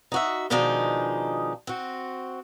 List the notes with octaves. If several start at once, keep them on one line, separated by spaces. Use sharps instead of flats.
D#4 F#4 E5
B2 D#3 F3 G#3 D4 D#4
C4 F#4